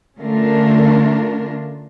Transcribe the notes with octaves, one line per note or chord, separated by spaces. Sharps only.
D3 A3 C#4 D4 F4 A#4